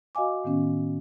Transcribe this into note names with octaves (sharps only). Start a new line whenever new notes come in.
F#4 D#5 F5 G#5 D6
A2 D#3 B3 C#4